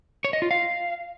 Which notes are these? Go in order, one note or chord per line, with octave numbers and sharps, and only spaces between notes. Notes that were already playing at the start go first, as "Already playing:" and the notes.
C#5
D#5
F4
F5